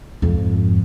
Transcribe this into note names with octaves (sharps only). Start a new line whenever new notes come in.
F2 G#2